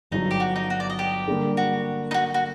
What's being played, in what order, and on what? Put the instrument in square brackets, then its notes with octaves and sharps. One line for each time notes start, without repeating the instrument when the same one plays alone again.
[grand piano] G1 G2 F#3 [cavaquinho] D#4
[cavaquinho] G4
F#4
D#4
F#4
D5
D#5
G4
[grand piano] D3 G3 A#3
[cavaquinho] F#4
D#4
F#4
F#4